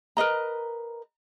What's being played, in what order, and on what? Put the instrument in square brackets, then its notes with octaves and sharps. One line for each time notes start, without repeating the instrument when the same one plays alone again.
[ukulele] A#4 B4 D#5 A#5